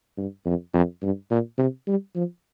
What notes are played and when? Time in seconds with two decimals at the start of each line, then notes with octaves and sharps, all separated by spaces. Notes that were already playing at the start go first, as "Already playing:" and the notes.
0.17 G2
0.45 F2
0.74 F2
1.02 G2
1.30 A#2
1.58 C3
1.87 G3
2.15 F3